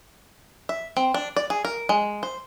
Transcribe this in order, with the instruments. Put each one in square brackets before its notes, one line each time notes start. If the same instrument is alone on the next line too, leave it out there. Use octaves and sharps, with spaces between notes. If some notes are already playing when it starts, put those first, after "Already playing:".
[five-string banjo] E5
C4
D4
D5
G#4
A#4
G#3
C5